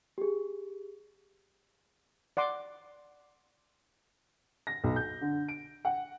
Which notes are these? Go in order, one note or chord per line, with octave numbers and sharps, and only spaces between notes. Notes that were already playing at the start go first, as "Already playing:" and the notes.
G4 G#4
D5 F#5 C6 D6
A#6
B1
G6
D3
D7
F#5